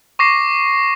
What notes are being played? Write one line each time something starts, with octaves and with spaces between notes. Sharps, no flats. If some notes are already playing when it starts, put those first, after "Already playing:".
C#6 D6 A#6 C7